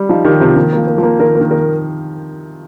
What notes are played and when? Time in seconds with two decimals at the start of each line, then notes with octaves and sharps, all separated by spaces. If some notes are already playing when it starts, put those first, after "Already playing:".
Already playing: G3
0.09 F3 D#4
0.25 D#3 G4
0.40 C3 F3
0.56 D#3 A#3
0.73 F3 A#3
0.87 A#3
0.98 F3 A#3
1.19 D#3 A#4
1.35 A#3
1.40 D#3
1.51 A#4